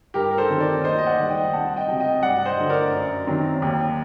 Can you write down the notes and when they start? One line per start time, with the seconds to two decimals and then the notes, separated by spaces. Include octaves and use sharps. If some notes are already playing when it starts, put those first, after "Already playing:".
0.14 G2 G4 A#4
0.31 A#4
0.37 A4 C5
0.50 D#3 F#3 C4
0.60 A#4 D5
0.83 D#2 C5 D#5
0.98 D#5
1.07 D5 F#5
1.19 D#3 G3
1.30 D#5 G5
1.53 C2 F#5 A5
1.76 D#5 G5
1.88 C3 F#3
2.00 D#5 G5
2.23 G2 D5 F#5
2.45 C5 D#5
2.58 D3 F#3
2.70 A#4 D5
2.92 F#2
3.27 D#3 F#3 C4
3.62 D#2